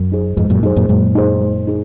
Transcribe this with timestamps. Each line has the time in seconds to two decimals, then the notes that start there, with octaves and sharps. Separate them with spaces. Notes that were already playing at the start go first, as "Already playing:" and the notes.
Already playing: F#2
0.12 D#4 G#4 C5
0.37 F2 G#2 G#3
0.50 F#2 A#2
0.63 F#2 D#4 G#4 C5
0.76 F#2 A#2
0.89 F#2 A#2 G#3
1.15 D#4 G#4 C5
1.41 G#3
1.67 D#4 G#4